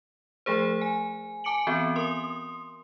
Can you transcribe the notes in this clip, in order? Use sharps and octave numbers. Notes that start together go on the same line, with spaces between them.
F3 A3 G#4 C5
G#5
G#5 A5 D6 C#7 D7 F#7
E3 B3 C4 F#4
A#4 C6 D#6